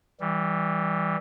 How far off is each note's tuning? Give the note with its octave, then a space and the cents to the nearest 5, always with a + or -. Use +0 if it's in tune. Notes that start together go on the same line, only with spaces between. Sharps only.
E3 -15 G3 +0